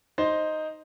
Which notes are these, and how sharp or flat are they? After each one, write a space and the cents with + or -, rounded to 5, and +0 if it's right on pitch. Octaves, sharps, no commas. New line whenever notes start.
D#4 +0 C5 +0